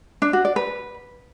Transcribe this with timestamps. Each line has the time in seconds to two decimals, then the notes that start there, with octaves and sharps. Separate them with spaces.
0.22 D4
0.33 F#4
0.45 D5
0.56 B4